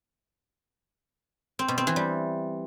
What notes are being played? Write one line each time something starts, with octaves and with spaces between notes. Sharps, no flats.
C4
B2
C4
E3
G3